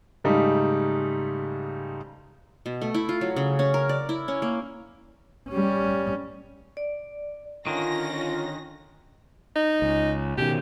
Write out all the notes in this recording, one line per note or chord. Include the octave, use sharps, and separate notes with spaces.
G#2 C#3 G3 A3 D#4
B2
A3
E4
F4
F#3
C#3
C#4
A#4
D5
E4
C#4
A#3
G3 C#4
D5
D3 D#3 C#4 F4 A#6
D#4
C#2
B2 D#3 G4